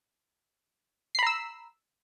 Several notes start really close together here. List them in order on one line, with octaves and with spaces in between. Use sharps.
C7 B5 A#5 E6